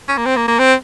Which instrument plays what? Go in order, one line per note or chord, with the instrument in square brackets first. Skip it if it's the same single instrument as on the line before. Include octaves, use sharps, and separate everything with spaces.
[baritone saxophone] C#4
A#3
C4
A#3
A#3
C4